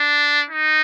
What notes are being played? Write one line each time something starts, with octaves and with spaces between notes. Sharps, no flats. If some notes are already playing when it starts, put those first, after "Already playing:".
Already playing: D4
D#4